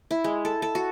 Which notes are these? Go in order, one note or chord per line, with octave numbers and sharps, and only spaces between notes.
E4
G#3
A4
A4
F#4